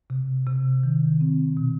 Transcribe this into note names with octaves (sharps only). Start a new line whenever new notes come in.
C3
C3
D#3
C4
B2